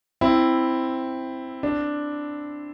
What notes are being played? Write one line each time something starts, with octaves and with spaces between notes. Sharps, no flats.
C4 E4
D4